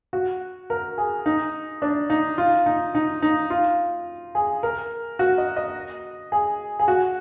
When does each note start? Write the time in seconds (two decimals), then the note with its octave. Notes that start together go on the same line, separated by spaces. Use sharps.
0.13 F#4
0.70 A#4
0.98 G#4
1.26 D#4
1.82 D4
2.10 D#4
2.38 F4
2.66 D#4
2.95 D#4
3.22 D#4
3.50 F4
4.35 G#4
4.63 A#4
5.19 F#4
5.38 D#5
5.56 D#5
6.32 G#4
6.79 G#4
6.88 F#4